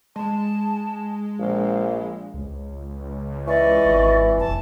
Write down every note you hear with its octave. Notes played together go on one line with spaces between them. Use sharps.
G#3 A5
A#1 F5
C#2
E3 D5 D#5 C#6
G#1
F1 A5